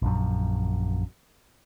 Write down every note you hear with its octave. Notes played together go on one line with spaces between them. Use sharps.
A#1 F#2